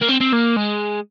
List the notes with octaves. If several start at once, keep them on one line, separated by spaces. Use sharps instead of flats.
A#3
C4
C4
A#3
G#3